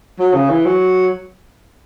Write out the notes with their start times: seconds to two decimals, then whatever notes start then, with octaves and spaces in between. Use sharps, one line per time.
0.19 F#3
0.34 C#3
0.49 E3
0.65 F#3